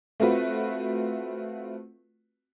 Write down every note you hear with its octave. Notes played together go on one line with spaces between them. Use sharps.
A3 C4 F4 F#4 B4